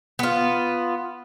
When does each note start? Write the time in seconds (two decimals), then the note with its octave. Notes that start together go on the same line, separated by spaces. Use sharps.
0.19 B3 F4